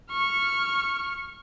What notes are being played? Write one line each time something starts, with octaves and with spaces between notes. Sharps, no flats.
C#6 F6